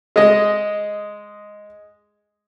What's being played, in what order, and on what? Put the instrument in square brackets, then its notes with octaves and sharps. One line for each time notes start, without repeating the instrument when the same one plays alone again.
[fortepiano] G#3 D#5